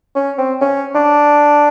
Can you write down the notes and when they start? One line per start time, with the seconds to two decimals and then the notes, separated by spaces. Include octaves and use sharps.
0.16 C#4
0.38 C4
0.61 C#4
0.95 D4